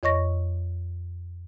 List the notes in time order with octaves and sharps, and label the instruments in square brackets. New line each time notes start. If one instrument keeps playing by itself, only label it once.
[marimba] F2 C#5 D#5 C#6 A#6